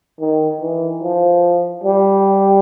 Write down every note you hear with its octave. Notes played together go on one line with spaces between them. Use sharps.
D#3
E3
F3
G3